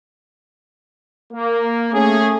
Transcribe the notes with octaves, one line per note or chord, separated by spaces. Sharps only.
A#3
A3 C#4 G#4